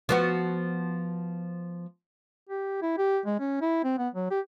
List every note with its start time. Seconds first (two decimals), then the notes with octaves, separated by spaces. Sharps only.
0.09 F3 B3 F#4
2.49 G4
2.82 E4
2.98 G4
3.26 G#3
3.40 C#4
3.61 E4
3.84 C4
3.98 B3
4.14 F#3
4.31 G4